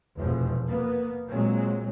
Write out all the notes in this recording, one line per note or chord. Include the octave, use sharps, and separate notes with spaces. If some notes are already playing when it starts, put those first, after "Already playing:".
F1 E2 B2 F3
A#3 B3
A#2 F#3 G#3 C4